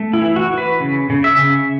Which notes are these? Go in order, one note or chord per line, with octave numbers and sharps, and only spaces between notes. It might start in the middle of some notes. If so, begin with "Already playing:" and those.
Already playing: A3
E4
E3
F#4
E3
B4
C#3
C#3
E5
C#3